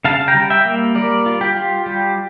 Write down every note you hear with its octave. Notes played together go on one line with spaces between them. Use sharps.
C#3 F5 A5
G5 A#5
G3
E5 G5
A#3
G3 A#4 D5
F4
G4
F4
G3 G4